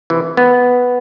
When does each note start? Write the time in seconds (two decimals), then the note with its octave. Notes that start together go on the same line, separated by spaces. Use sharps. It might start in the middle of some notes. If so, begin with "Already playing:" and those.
0.10 C3 E3
0.37 B3